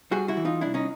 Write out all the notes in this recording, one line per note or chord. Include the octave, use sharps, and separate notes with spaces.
G3 F#4 G#4
E4 F#4
E3
D#4 F4
C2 D4 E4
C#4 D#4